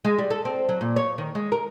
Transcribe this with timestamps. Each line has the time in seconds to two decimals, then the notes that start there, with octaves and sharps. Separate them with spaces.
0.05 G#3
0.18 G3
0.30 A4
0.45 C4
0.69 F#3
0.81 A#2
0.96 C#5
1.18 D#3
1.35 G#3
1.52 A#4